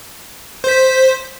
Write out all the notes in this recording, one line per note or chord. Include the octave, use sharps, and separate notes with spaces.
C5 B6